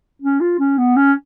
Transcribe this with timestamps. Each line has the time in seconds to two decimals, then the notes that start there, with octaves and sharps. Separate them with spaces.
0.22 C#4
0.41 F4
0.59 C#4
0.78 B3
0.96 C#4